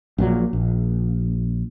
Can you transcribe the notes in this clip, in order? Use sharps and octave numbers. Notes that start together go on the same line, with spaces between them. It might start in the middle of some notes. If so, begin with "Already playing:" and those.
A#1 A#2 D3 F#3
A#1